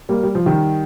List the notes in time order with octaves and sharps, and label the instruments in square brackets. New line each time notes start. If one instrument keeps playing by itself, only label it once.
[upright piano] G3 A#3
G3
F3
D#3 G3